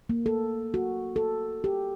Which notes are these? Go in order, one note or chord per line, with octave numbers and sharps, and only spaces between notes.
A#3
A4
F#4
A4
G4